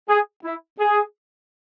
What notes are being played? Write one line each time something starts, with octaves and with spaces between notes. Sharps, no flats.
G#4
E4
G#4